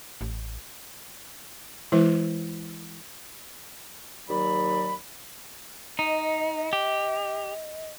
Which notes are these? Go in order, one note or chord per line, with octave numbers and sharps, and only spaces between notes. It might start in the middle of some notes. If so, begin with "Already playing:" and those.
A1
E3 G#3 E4 B4
D#2 F#3 D5 B5
D#4 D#5
G4